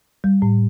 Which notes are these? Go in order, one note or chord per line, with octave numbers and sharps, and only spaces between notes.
G3
A2